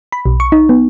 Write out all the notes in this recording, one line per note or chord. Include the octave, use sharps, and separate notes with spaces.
B5
B1
C#6
D#4
B3